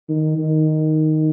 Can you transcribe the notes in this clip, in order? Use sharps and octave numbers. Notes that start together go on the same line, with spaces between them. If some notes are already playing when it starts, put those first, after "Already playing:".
D#3
D#3